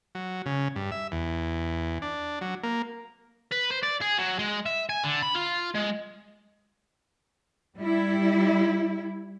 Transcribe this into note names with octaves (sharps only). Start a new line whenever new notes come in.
F#3
C#3
G2
E5
E2
D4
F#3
A#3
B4
C5
D5
G#4
F#3
G#3
E5
G#5
D3
B5
F4
G#3
G3 E4